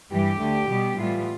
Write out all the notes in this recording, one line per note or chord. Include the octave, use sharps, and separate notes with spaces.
G2 E3 G3 G4
D2 D3 A3
B2 G3 B3
A2 E3 G3 B3 F4